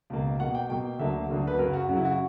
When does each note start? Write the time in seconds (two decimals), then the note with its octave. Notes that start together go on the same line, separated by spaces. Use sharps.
0.10 C#2 B2 A#3
0.40 B2 A#3 F#5
0.55 G5
0.69 B2 A#3 G5
0.99 D2 D3 F#3 A#3 E5
1.29 D2 D3 F#3 A#3
1.47 B4
1.58 F#2 C#3 F#3 A#4
1.73 F#4
1.88 F#2 C#3 F#3 F#4
1.97 E4
2.05 F#4